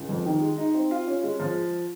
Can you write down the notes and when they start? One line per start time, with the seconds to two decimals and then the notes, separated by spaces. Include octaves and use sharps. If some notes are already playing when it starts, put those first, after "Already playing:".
Already playing: C#2
0.09 F2
0.26 D#3
0.41 G#3
0.58 D#4
0.74 C4
0.91 F4
1.08 C#4
1.23 G#3
1.40 F3